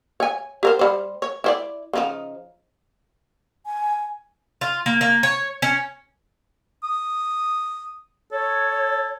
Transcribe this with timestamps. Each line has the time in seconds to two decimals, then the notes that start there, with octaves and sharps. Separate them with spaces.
0.20 C#5 G#5
0.63 G4 A#4 C5
0.79 G3 C5
1.22 C#5
1.44 E4 C5 D5
1.93 C#3 F3 D#4
3.66 G#5
4.61 F4
4.86 A#3
5.01 A#3
5.23 C#5
5.62 C#4
6.84 D#6
8.32 A4 C#5